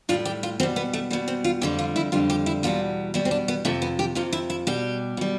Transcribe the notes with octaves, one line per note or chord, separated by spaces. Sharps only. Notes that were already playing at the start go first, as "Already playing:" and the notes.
A2 G3 F4
G4
F4
B2 G3 C4
B3
A3
B2 G3 B3
C4
F4
F2 D3 G3 G4
F4
E4
F2 D3 G3 F4
G4
E4
E2 B2 G3 F4
E2 B2 G3 E4
C4
D4
B3
F2 C3 F3 A3
B3
G4
F2 C3 F3 F4
E4
E4
B2 G3 G4
B2 G3